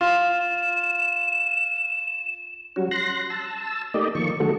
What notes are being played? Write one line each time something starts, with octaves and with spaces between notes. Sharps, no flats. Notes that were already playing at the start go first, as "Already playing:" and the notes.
F4 E7
F#3 G3 C#4 F#4
C6 F#6 A#6
A5 E6
A3 A#3 D#4 G4 D5 D#5
D#3 F3 A#3 C#6
D3 F3 G#3 A3 F#4 A4